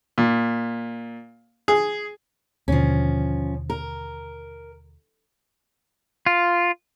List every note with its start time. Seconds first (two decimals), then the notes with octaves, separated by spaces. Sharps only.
0.18 A#2
1.68 G#4
2.68 D#2 B2 D3 F3 C#4
3.70 A#4
6.26 F4